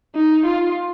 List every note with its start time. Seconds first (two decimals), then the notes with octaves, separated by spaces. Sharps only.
0.15 D#4
0.45 F4